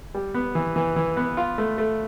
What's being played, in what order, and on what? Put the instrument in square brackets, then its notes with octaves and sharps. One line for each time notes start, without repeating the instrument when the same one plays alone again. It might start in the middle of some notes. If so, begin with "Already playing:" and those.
[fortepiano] G3
B3
E3
E3
E3
B3
F4
A3
A3